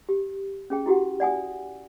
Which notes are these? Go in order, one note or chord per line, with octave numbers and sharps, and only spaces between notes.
G4
C#4 G#4 G5
E4 F#4 G4 F#5
D5 F#5 G#5 D#6